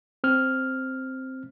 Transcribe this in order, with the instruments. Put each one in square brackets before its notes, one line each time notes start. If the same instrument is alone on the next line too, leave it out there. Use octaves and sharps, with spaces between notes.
[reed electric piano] C4 F6